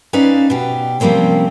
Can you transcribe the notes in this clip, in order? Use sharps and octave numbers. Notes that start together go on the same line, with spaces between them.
C#4 D#4 B4 C5 D5 F5
B2 G4
C3 F3 G3 A#3 C4 C#4